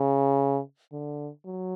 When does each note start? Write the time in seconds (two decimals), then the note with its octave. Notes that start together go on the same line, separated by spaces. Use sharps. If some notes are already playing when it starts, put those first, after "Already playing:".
Already playing: C#3
0.92 D3
1.45 F#3